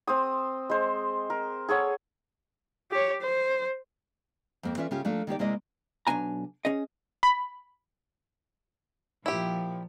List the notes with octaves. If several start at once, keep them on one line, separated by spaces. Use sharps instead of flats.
C4 C5 D#6
G#3 C5
A#4
G#4 A4 C#5 F#5
G4 C#5
C5
F2 A#3 C4
E3 C#4 F4 D5 E5
C#3 C#4 F4 G4
F3 A3 A#3 D4 F4
D#3 A#3 G4 D5
C3 G#3 A#3 E4 D5 D#5
B1 G2 D4 G#5 A#5
C#4 G#4 D#5
B5
A#2 F3 E4 G4